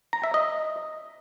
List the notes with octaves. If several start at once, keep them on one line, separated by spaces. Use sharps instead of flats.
A#5
E5
D#5